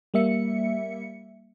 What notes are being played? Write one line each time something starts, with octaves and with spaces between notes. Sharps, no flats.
G3 A#3 E5 C#7